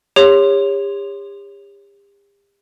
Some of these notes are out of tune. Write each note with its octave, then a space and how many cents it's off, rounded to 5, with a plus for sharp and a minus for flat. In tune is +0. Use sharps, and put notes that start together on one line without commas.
G4 +40 C#5 +0 C6 +0